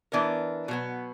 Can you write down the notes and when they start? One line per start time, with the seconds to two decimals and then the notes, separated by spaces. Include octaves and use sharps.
0.12 E3 B3 D4 A#4
0.68 B2 F#3 B3